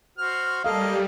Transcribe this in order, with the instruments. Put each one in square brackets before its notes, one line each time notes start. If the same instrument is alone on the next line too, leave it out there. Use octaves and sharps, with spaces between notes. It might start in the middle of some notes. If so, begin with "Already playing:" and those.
[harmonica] F#4 C5 F6
[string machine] G3 [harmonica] A#3 D#5 [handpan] A4 F5